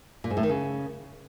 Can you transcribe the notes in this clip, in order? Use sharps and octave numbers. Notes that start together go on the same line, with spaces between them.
A#2
G#2
A2
D#3
C#3